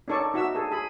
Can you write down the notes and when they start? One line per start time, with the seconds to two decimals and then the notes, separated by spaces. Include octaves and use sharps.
0.08 C#4 D#4 A4 D5 C#6
0.34 D#4 F#4 E5 E6
0.55 G#4 A4
0.72 G#4 B5